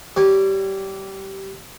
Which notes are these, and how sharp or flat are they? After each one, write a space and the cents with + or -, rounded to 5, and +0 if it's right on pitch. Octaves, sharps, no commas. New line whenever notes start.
G3 -20 C#5 -25